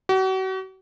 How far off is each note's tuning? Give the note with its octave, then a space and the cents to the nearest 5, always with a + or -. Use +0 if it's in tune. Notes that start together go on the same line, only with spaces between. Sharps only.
F#4 +40